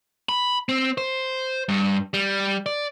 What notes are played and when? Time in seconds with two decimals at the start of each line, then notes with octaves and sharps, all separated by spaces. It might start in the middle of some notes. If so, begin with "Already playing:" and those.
0.29 B5
0.69 C4
0.98 C5
1.69 G2
2.14 G3
2.66 D5